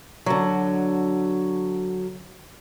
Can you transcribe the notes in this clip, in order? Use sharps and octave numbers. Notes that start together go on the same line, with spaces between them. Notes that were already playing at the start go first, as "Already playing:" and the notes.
D3 F#3